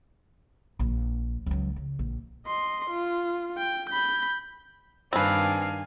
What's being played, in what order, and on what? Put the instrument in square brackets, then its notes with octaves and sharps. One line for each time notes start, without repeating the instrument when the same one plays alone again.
[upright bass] A#1
C#2 F#3
C#3
A#1
[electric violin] D#5 C6
F4
G5
B5 G6
[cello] G2 D#3 [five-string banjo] C4 B4 [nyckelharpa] D4 F5 [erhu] G#5